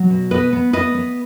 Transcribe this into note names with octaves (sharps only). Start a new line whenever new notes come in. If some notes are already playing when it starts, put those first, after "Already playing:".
Already playing: F#3
B2
B3 B4 D#5
B3
B3 B4 D#5
B3